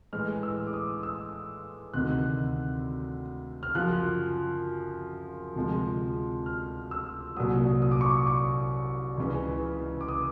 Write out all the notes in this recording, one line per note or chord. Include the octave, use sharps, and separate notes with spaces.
A2 E3 G#3 F6
E6
D6
D#6
E6
D2 C3 D#3 F#6
F6
F#2 C#3 F3 F#6
D2 C3 F3 G#3
F6
E6
C2 A#2 F#3 D#6
D#6
D6
C#6
D6
C#6
C#2 C#3 E3
D6
D#6